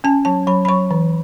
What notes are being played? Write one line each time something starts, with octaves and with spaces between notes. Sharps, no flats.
C#4 A5
F#3 A5
F#3 B5
B5
F#3 C#6
E3